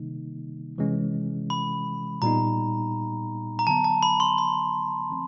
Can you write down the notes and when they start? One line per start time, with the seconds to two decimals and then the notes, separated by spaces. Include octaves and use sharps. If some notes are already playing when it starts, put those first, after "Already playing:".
Already playing: C3 D#3 G3 A#3 D#4
0.78 C3 E3 G#3 C#4
1.50 B5
2.22 A#2 G3 B3 D#4 A#5
3.59 A#5
3.67 D3 F#3 B3 A5
3.84 A5
4.03 B5
4.20 C6
4.38 B5
5.10 F3 A3 C4